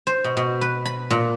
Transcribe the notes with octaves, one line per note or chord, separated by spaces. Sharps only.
C5
B2
B2
B4
B5
A#2